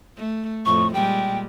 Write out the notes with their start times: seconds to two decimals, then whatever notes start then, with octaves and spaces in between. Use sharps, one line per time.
0.17 A3
0.66 F2 A2 C#6
0.94 A#2 G3 G#3 G5